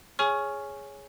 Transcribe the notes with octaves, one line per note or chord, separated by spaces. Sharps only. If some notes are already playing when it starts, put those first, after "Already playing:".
G#4 C#5 G#5 C#6 F6